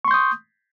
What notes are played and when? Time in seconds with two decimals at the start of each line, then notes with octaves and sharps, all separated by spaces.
0.05 C#6
0.08 C6
0.11 G6
0.14 D#6